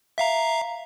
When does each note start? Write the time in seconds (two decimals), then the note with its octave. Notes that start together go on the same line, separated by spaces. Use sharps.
0.18 E5 F5 A#5